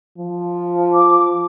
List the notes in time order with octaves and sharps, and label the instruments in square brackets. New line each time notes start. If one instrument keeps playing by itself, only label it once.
[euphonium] F3
[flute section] D6